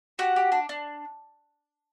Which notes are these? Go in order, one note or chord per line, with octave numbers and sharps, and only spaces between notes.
F#4 G4 F#5
G4
D4
D4